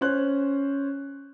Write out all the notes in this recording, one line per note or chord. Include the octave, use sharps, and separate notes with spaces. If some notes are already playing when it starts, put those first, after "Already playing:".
C#4 C5 F#6